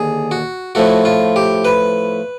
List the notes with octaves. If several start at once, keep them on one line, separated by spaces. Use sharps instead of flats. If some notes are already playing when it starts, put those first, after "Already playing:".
Already playing: D#2 D3 G#4
F#4
A2 F3 A3 F#4
F4
G4
B4